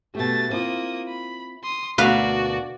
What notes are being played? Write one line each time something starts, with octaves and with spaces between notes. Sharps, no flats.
B2 A3 G4 A6
A#3 C4 E4 F4 D#6
B5
C6 D#6
D2 B2 A#3 F#4 B4 D5 F5